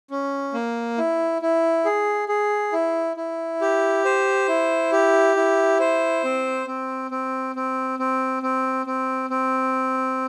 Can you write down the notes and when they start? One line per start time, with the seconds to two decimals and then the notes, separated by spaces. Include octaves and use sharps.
0.11 C#4
0.53 A#3
0.98 E4
1.42 E4
1.85 G#4
2.29 G#4
2.72 E4
3.17 E4
3.61 G4
4.05 C5
4.48 E4
4.92 G4
5.36 E4
5.80 C5
6.24 C4
6.67 C4
7.11 C4
7.56 C4
7.99 C4
8.43 C4
8.86 C4
9.30 C4